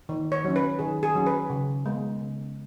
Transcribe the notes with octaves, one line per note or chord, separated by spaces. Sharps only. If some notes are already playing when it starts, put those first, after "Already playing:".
D#3
C#5
F#3 C#4
B4
D#3 G#4
G#4
F#3 C#4
B4
C#3
G#3 B3
C#3